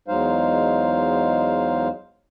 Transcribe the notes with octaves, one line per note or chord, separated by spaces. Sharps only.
E2 F#3 G#3 D#4 C5 F5